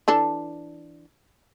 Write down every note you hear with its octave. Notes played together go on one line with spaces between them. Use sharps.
E3 D4 A4